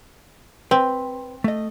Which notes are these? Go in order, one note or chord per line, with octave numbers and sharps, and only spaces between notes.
C4 B4
A3 D#5